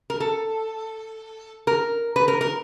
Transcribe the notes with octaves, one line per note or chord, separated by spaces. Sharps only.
A#4
A4
A#4
B4
A#4
A#4